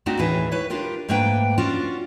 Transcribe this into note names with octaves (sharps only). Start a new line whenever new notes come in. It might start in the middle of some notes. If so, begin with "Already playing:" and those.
A3 C4 D4 D#4 F#4
D#2 A2 E3 G#4 B4 E5
E4 B4 C#5
D4 F4 G4 A#4
G#2 A3 A#3 D4 B4 G5
C#4 D4 F4 F#4